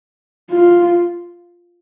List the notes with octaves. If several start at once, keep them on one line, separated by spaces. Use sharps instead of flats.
F4